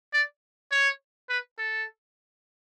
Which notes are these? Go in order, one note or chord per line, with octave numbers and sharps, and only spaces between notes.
D5
C#5
B4
A4